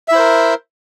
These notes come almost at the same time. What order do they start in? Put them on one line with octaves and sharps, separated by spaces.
E5 E4 C5 A#4